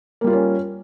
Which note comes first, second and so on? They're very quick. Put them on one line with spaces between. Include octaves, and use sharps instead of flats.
A#3 G3 F4 A#4 C#4